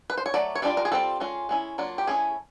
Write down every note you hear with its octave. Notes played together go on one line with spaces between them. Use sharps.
B4
C5
C#5
F#3 A3 D5
C#5
G3 B3 D4 F4 D5
A#4
G#4
G3 C4 F4 A4
G#3 C#4 F4
G#3 C#4 E4
F#3 A#3 D4 F4
G4
A3 C#4 E4 G#4